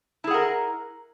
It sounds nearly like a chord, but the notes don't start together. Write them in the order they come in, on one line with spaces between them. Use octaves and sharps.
E4 G#4 F#5 A#4